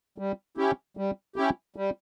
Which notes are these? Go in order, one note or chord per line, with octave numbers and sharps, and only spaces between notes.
G3
C#4 E4 G4
G3
C#4 E4 G4
G3